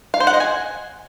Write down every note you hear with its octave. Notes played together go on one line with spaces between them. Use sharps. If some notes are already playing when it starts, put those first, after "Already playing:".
F5
C5
F#5
D#5
G#5